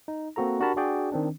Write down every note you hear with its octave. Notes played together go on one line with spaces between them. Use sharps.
D#4
A#3 C4 F#4 A4 A#5
D4 F#4 G4 A#4 A5 B5
D4 F#4 G#4 D5 G5
D#3 C4 D4